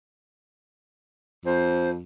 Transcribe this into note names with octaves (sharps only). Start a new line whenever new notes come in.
F2 C5